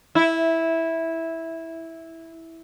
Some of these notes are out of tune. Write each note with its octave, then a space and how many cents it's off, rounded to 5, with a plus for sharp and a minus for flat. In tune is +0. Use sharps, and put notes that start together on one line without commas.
E4 -10